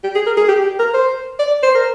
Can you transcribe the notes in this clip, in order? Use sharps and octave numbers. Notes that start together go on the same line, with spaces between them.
G4
G#4
A#4
G#4
G4
G4
A#4
C5
D5
C5
A#4